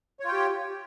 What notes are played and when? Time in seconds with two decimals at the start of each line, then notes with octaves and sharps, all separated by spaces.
0.20 C#5
0.24 F4
0.28 G5
0.33 G4